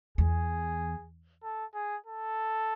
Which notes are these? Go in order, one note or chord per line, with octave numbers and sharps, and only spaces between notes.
E2 G#4
A4
G#4
A4